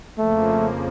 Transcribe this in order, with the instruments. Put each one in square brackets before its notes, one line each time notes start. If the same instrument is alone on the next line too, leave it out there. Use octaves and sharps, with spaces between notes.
[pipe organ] F2 C#3 F3 A#3 [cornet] A3